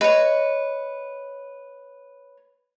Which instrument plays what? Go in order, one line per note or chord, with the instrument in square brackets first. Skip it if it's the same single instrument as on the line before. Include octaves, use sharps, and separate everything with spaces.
[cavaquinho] B4 C#5 [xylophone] D#5